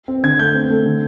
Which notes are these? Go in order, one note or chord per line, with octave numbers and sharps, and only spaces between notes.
C4
D3 G#6
A3 G6
C4
A3
D3